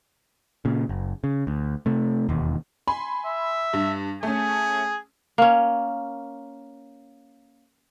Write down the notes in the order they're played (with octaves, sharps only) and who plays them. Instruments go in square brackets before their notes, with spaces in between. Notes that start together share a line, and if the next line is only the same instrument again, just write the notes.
[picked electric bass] A#2 C#3
F#1
C#3
D2
C3 A3
E1 D#2
[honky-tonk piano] G#5 B5 C6
[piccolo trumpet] E5
[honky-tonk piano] G2
[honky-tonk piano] A3 C#4 [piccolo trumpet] G#4
[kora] A#3 C#4